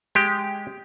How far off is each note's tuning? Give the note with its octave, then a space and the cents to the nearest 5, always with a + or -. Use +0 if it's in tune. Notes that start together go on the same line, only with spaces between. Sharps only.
G#3 +0 G4 +0